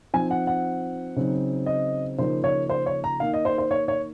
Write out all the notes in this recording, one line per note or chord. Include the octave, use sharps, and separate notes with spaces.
F3 C4 D#4 G#5
F#5
F#5
C#3 F#3 C4 D#4
D#5
C#3 F3 A#3 D#4 C5
C#5
C5
C#5
A#5
D#3 A#3 D#4 F5
D#5
C5
C5
C#5
C#5